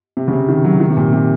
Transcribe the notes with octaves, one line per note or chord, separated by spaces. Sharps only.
C3
C#3
C3
D#3
F#3
D#3
C3
A#2
C3